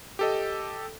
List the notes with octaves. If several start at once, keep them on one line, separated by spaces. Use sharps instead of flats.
G4 A4 D#5